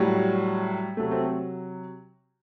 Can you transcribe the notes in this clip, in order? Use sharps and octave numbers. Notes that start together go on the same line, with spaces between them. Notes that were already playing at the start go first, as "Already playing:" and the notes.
Already playing: A2 F#3 G3
C3 F#3 A3
A3 C4